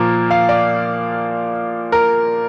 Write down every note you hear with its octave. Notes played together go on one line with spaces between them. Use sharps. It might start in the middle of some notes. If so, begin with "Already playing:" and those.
Already playing: A#2 F3 A#3 A#4
F5
D5
A#4